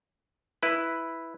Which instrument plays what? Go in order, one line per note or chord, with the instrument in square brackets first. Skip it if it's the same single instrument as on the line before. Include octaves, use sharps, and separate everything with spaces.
[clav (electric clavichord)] E4 B4